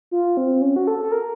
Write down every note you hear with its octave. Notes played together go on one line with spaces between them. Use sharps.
F4
C4
C#4
F#4
A4
A4
A#4